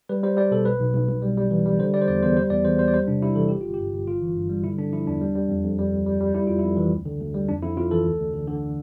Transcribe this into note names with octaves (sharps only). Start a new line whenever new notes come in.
G3 B4
G3 C5
G3 D5
B2 A4
B1 B4
B1
B1
B1
G3
G3
E3
G3
D3 C5
G3 D5
C5
E2 D5
E2 C5
G3 C5
E2 D5
E2 C5
G3 C5
D5
G3 C5
C3 D4
G3 E4
E3 A4
G1 G4
G1 F4
G2 G4
G1
G1 F4
E3
G2
G3
D3 E4
D3 D4
F3 E4
E2 D4
G3
G3
F2
F2
G3
D2
G3
G3
G3 E4
F2 F4
F2 E4
E3
D2
D3
D2
G3
F2 D4
F2 E4
F2 F4
E3 A4
D2
D2
D3
D3